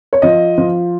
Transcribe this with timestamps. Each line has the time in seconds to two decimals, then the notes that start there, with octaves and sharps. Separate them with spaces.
0.13 C#5
0.22 F3 D#5
0.58 F3